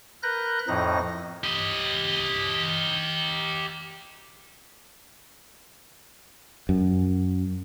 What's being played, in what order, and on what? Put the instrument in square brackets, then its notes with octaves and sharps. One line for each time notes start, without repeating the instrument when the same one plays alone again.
[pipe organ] A#4 B4 F#6 G6 A#6
F2 A2 F3 D#4 A#6
[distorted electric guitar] G4 D#5
[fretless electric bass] F#2